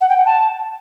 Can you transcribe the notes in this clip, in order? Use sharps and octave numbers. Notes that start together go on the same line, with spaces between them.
F#5
G5
F#5
A5